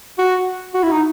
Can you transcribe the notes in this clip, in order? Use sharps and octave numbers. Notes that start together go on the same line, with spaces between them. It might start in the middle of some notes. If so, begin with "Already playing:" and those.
F#4
F#4
E4
D#4